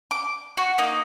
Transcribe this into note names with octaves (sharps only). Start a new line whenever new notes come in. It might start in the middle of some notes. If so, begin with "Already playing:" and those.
D6
F#4
A#3 D#4 D6